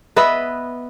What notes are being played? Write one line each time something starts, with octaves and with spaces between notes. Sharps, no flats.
B3 B4 D#5 E5